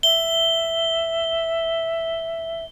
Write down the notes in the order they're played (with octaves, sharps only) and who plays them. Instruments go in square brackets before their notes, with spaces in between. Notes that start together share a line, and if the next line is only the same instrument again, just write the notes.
[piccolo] E5 [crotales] G7